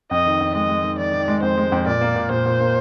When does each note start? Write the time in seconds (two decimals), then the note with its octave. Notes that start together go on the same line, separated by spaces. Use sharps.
0.11 F2 D#5
0.26 D#3
0.41 F2
0.55 G#3 D#5
0.69 G#3
0.84 D#3
0.98 D#3 D5
1.14 D#3
1.28 G#3
1.42 F2 C5
1.57 G#3
1.72 F2
1.86 A#2 D5
2.01 A#3
2.16 A#2
2.30 A#2 C5
2.46 A#2
2.61 A#3